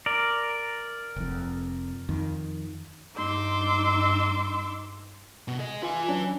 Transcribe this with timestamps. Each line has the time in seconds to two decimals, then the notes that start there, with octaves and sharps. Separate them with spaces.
0.06 A#4 D5
1.16 F1 F2
2.09 F2 D#3
3.16 G2 D#4 C6 D6 E6
5.48 B2
5.60 G#4 D#5
5.83 F4 B4 G#5
6.08 F#3 C#4 D4